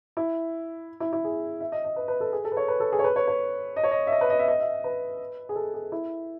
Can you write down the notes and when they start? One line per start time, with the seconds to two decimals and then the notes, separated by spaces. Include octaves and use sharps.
0.17 E4
1.00 E4
1.13 E4
1.24 G#4
1.61 E5
1.72 D#5
1.84 D#5
1.96 B4
2.08 B4
2.20 A4
2.33 G#4
2.45 A4
2.52 B4
2.57 C#5
2.68 B4
2.80 A4
2.92 G#4
2.99 C#5
3.04 B4
3.16 C#5
3.28 C#5
3.76 D#5
3.84 C#5
3.91 D#5
4.07 E5
4.12 D#5
4.21 B4
4.30 D#5
4.39 E5
4.48 D#5
4.60 E5
4.84 B4
5.49 G#4
5.56 A4
5.74 G#4
5.92 E4